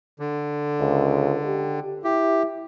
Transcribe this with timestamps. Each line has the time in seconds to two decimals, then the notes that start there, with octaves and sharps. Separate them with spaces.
0.19 D3
0.81 C#2
1.46 G4
2.04 E4 G4